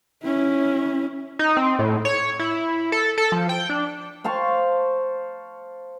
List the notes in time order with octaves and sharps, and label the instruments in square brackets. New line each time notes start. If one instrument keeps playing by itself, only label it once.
[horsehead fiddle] C#4 E4
[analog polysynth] D#4
C4
A2
C#5
E4
A4
A4
F3
G5
D4
[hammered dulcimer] C5 F5 A5 C#6